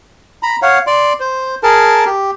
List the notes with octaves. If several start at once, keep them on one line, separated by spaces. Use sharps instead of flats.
A#5 B5
C#5 F5 F#5
D5 C6
C5
G#4 A#4 A5
G4